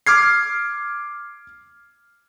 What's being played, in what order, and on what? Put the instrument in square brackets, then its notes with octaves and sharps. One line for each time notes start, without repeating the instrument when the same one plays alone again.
[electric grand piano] D6 F6 G#6 C7